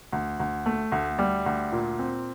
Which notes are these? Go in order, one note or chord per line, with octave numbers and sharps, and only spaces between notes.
D2
D2
A3
D2
G3
D2
A#2
C4